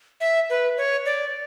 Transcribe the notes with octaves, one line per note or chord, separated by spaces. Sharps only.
E5
B4
C#5
D5